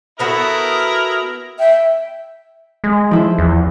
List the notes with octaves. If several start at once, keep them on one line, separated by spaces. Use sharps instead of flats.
A3 B3 E4 F#4 A#4 D#6
E5 G5
G#3
F3 E4 C5
E2